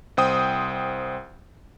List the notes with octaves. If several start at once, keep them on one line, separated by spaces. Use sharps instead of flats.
C2 C5 G5 D#6